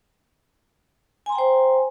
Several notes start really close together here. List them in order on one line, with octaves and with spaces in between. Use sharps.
G#5 C6 A#5 G5 C5